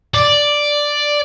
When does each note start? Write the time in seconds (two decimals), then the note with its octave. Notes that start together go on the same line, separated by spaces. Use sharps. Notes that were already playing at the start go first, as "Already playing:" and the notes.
0.14 D5